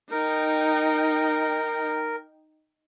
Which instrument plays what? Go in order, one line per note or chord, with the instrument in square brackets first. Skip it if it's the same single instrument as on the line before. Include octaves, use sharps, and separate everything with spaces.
[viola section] D#4 G5 [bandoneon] A#4